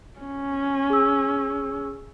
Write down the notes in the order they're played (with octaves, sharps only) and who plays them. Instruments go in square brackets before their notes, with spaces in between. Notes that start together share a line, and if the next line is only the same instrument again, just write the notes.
[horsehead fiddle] C#4
[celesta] G#4 E6